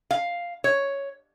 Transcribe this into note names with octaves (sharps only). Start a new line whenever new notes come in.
F5
C#5